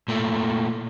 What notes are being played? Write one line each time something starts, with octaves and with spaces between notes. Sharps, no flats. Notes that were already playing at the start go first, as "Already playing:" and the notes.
A#2 A3